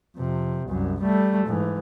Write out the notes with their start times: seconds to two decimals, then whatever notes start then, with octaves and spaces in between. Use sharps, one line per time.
0.16 F2 C3
0.67 C2 F#2
1.01 G3 A3
1.47 G#2 E3